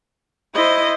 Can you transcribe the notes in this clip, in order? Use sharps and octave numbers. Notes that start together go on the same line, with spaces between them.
E4 C5 D#5